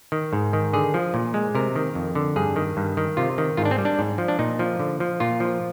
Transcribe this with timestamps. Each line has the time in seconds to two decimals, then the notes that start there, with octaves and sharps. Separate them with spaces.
0.12 D#3
0.33 G#2
0.53 D#3
0.73 D3 G#4
0.94 F3
1.14 A#2
1.34 G#3
1.55 C3 A#4
1.76 D#3
1.95 F2
2.15 D3
2.36 G2 G#4
2.56 D#3
2.77 G2
2.97 D#3
3.17 C3 F4
3.38 D#3
3.57 G#2 F4
3.65 D4
3.71 C4
3.78 G3
3.85 D4
3.99 G#2
4.18 F3
4.28 D4
4.39 A#2 D#4
4.59 F3
4.80 D3
5.00 F3
5.20 A#2 F4
5.40 F3